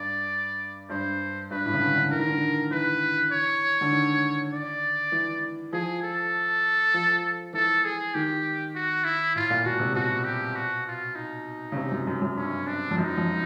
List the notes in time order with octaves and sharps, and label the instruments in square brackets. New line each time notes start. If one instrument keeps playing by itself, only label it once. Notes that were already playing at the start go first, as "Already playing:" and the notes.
Already playing: [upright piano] G2 [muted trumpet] D5
[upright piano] G2 [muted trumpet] C5
[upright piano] G2 [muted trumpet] B4
[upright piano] A2
C#3
D3
D3
[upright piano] E3 [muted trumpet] A#4
[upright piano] D#3
D3
D#3
[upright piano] E3 [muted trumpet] B4
[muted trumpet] C#5
[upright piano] D3
D#3
[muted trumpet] D5
[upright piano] E3
[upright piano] F3 [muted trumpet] G#4
[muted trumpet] A4
[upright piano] F3
[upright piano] E3 [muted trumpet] A4
[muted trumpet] G#4
[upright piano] D#3 [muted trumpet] G4
[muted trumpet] F#4
E4
[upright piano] A2 [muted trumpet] F4
[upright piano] A#2
[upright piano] B2 [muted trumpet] F#4
[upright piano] C3
[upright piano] B2 [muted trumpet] F#4
[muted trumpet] G4
F#4
F4
D#4
[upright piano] C#3
C3
F#2
F#2
F#2
[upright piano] G2 [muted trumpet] C#4
[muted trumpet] D4
[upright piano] F2
[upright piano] F#2 [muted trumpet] D#4
[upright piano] F2